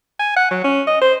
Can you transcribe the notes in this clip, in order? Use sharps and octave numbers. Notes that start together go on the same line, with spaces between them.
G#5
F#5
F#3
C#4
D#5
C5